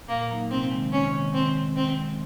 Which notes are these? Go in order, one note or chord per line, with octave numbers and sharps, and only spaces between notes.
A#2 A#3
F#3 A#3 D#4
C3 C4
D#3 G#3 C4
C3 C#4
D#3 G#3 C4
D#3 C4
G#3 C4
D#3 C4
G#3 C4